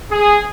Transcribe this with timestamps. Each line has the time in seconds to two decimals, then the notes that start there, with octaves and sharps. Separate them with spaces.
0.10 G#4